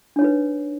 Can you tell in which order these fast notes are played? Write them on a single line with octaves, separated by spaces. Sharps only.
D4 C#5 D#4 B4